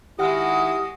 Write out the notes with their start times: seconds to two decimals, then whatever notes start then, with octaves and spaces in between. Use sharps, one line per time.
0.19 D#3 G#3 E4 F#4 G4 F#5 D#6 F6